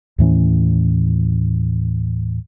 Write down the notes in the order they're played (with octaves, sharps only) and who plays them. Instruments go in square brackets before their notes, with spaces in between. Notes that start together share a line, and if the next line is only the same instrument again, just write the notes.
[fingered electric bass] D#2 A2 E3 C#4